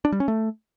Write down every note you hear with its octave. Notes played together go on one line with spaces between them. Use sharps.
D4
G3
C#4
A3